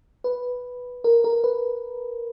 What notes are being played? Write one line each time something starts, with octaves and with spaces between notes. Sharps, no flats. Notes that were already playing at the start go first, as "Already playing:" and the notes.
B4
A#4
A#4
B4